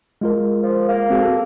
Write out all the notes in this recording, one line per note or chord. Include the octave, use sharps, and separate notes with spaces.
G#3 F4 A#4
F3
A#3
C4 F#4 G#4
A4